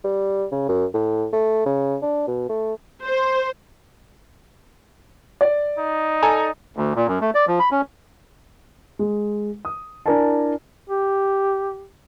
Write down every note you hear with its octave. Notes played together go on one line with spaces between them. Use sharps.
G3
C#3
F#2
A2
A3
C#3
D4
B2
A3
C5
D5
D#4
A4 G#5 A#5
D2
A#2
F#2
A3
D5
F3
B5
C#4
G#3
D#6
D4 E4 A#4 D5 G#5 A5
G4